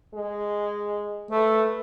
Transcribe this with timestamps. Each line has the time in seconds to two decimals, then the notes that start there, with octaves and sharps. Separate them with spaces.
0.14 G#3
1.31 A3 B4